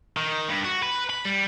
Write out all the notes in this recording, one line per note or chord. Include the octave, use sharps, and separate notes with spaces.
D#3
G2
F#4
B4
B5
G3